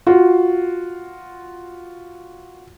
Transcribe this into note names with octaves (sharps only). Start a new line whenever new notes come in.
F4 F#4